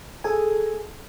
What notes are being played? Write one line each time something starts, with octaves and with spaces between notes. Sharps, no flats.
G#4 A4 G#5